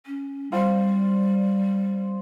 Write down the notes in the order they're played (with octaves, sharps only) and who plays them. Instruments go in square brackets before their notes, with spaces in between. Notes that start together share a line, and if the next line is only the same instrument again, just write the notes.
[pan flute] C#4
[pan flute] G3 [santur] C4 F4